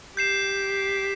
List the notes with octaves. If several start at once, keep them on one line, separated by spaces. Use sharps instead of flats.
G4 G6 C7 E7